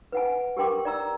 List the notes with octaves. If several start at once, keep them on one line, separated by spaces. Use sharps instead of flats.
B4 F#5 G#5
G4 A#4 G5 C6 D6
D5 A#5 E6